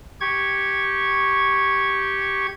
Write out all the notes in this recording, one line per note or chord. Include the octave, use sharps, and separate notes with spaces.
G4 C#6 G#6